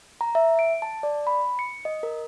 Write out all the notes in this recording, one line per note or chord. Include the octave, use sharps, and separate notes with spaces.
A#5
E5
D7
A5
D5
B5
C#7
D#5
A#4